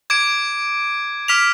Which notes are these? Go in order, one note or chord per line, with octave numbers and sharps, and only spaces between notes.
D6 G#6 D7
D6 F6 B6 F7